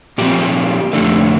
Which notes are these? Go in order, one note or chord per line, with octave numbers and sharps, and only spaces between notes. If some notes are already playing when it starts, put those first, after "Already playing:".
A#2 F3 C4 G4
F2 D3 A3